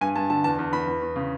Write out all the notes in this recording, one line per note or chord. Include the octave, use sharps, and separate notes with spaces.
G2 G#5
G2 A5
D3 A5
E2 A5
E2
E2 B5
E2
E2
C#3